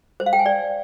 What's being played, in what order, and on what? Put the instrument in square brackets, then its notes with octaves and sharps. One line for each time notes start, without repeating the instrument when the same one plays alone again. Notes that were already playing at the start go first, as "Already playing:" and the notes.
[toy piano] C5
F5
G5
G#5
D5